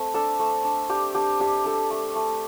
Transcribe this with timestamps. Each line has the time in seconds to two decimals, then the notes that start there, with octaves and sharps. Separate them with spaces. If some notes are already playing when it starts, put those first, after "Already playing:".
Already playing: A3 C4
0.14 D4 A4
0.40 A3
0.64 D4
0.90 D4 G4
1.15 D4 G4
1.40 D4 G4
1.65 D4 A4
1.91 A3
2.16 A3